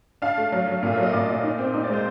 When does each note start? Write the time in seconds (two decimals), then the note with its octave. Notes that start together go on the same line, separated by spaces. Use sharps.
0.22 D4 F5
0.38 A3
0.52 F#3
0.67 F#3
0.83 A#2 F5
0.92 F#3 E5
1.03 D#5
1.13 A#2 D5
1.28 A#2
1.43 D#4
1.59 C4
1.73 D#4 D#5
1.84 D5
1.89 G#3 C5